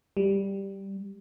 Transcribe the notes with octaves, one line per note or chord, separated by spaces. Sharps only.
G3